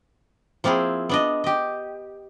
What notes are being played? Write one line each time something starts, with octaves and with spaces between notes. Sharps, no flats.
F3 A#3 C4 E4 G#4
B3 D4 D#5
G4 D#5